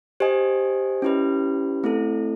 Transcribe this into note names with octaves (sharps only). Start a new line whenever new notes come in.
G4 C5 D#5 G#5
C#4 E4 G4 B4
A3 C4 E4 A4